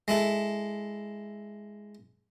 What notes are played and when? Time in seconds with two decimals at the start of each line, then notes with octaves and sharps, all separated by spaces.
0.08 G#3 E4 A4